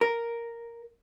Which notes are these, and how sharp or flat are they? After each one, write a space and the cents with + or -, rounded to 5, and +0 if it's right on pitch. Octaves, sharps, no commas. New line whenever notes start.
A#4 +0